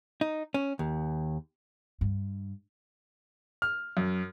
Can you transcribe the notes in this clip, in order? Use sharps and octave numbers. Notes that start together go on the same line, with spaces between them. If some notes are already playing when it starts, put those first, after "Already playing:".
D#4
C#4
D#2
G2
F6
F#2